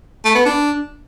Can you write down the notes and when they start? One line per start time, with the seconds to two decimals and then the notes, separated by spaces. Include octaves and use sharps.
0.25 A3
0.35 B3
0.45 D4